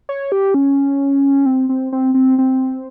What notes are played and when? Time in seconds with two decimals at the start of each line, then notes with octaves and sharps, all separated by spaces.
0.09 C#5
0.32 G4
0.54 C#4
1.46 C4
1.69 C4
1.93 C4
2.14 C4
2.39 C4